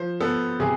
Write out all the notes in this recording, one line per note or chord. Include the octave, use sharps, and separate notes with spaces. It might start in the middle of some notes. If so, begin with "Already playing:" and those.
Already playing: F3 C5
B3 A4
C3 G#4